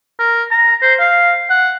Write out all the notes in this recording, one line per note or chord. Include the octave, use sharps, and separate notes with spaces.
A#4
A#5
C5
F5
F#5